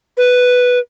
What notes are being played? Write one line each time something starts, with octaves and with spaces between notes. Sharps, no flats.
B4